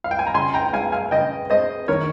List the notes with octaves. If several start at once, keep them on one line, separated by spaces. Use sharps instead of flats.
F5
G5
G#5
A#5
C#3 G#5 C6
G5 A#5
G#3 F5 G#5
F5 G#5
C#3 D#5 G5
G#3 C5 D#5
D#3 A#4 C#5